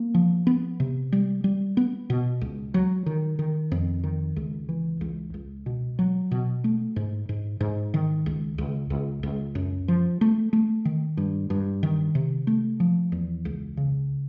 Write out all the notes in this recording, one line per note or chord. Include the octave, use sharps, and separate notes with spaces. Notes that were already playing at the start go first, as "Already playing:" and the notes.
Already playing: A#3
F3
B3
C3
G3
G3
B3
B2
C#2
F#3
D#3
D#3
F2
D#3
C#2
E3
C#2
C#2
B2
F#3
B2
A3
G#2
G#2
G#2
D#3
C#2
C#2
C#2
C#2
F#2
F3
A3
A3
D#3
G2
G2
D#3
C3
A3
F3
E2
C#2
C#3